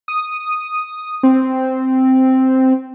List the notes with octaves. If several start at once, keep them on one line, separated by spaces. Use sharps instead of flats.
D#6
C4